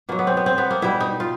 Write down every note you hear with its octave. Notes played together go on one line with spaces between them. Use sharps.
B2 F#3 A#3
B3
C4
B3
C4
B3
A#3
B2 G3 E4
D#4
F4